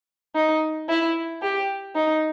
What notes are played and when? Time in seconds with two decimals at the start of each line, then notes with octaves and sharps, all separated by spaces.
0.35 D#4
0.89 E4
1.42 G4
1.95 D#4